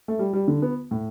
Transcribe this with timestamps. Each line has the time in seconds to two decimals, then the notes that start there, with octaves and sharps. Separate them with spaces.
0.08 A3
0.19 G3
0.33 G3
0.48 D3
0.62 B3
0.91 A2